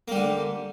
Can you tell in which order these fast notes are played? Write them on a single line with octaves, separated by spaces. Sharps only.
A#3 G3 D3